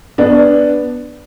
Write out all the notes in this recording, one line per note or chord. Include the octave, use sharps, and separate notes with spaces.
B3 D4